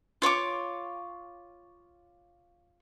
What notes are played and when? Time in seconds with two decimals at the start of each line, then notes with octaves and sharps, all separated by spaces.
0.22 F4 C#5 C#6 D6